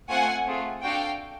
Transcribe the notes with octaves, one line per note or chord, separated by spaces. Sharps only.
A3 C4 F4 F#5 G#5
A3 C4 F4 G#4
D4 F#4 A4 F5 G5